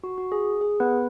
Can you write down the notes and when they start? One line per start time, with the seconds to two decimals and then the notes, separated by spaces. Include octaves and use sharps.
0.04 F#4
0.18 F#4
0.32 G#4
0.61 G#4
0.80 B3 B4